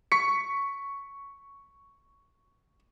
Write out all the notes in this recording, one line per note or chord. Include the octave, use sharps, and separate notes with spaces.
C#6 B6 C#7